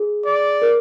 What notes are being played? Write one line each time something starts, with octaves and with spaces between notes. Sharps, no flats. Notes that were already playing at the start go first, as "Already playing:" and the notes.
Already playing: G#4
D5
A#4